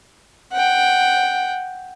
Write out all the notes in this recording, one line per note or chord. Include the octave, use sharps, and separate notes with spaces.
F#5 G5